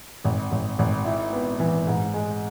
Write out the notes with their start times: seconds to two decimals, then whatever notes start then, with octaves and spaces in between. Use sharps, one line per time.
0.24 G#1
0.52 G#1
0.79 G#1
1.05 E4
1.33 B3
1.60 E3
1.87 G#2
2.14 G#3